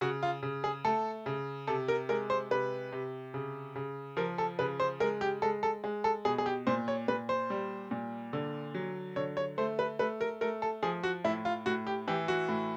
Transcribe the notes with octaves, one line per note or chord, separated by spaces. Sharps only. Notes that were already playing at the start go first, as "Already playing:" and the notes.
C#3 F#4
F4
C#3
G#4
A3 A4
C#3
C3 A4
A#4
G#3 A#4
C5
C3 B4
C3
C#3
C#3
F3 A#4
A4
C#3 B4
C5
G#3 A#4
G4
G#3 A4
A4
G#3
A4
B2 G#4
G#4
G4
A#2 C5
C#5
A#2 B4
C5
G3
A#2
D3
F#3
D3 C#5
C#5
A3 C5
B4
A3 B4
A#4
A3 A#4
A4
F3 G#4
F#4
A2 E4
F4
A2 F#4
G4
E3 G4
F#4
A2